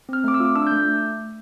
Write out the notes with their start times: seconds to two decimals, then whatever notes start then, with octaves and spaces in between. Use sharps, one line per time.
0.09 C4 F6
0.24 A3 D6
0.34 E6
0.40 F4 D6
0.56 D4 E6
0.67 G6
0.72 A3